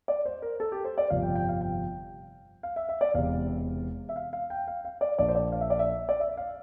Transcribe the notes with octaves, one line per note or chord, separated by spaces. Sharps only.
D5
C5
A#4
A4
G4
C5
D5
G1 F2 C3 F3 F5
G5
G5
F5
G5
F5
E5
E5
D5
E1 E2 C3 F5
E5
F5
F5
G5
F5
F5
D5
A#1 A#2 F3 A#3 D4 D5
C5
D5
F5
E5
D5
E5
D5
E5
F5